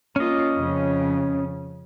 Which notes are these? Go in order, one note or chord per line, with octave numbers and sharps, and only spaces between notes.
A#3 C#4 F4 D#5
F2 C#3